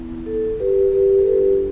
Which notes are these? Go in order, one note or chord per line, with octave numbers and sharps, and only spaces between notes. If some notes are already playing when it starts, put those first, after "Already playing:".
Already playing: B3 E4
A4
G4 B4
G4 B4
A4
G3 D4 F4 G4 B4